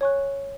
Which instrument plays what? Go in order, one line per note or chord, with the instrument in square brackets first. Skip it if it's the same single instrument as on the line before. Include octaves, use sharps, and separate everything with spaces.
[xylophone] C#5 G#5 C#6 F#6